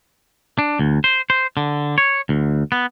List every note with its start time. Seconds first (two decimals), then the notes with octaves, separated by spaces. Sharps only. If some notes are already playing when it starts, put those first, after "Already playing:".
0.58 D4
0.79 D2
1.04 C5
1.30 C5
1.57 D3
1.98 C#5
2.29 D2
2.72 B3